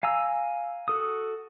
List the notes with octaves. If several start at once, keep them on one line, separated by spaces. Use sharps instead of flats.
F5 G#5 A#5 E6
F#4 A4 D#6